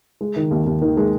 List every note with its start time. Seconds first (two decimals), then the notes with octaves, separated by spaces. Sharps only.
0.21 G#3
0.36 D#3
0.51 D#2
0.66 D#2
0.82 D#3
0.97 G#3